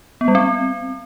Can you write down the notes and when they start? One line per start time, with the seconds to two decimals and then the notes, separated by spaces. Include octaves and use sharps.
0.21 B3
0.28 G3
0.35 C4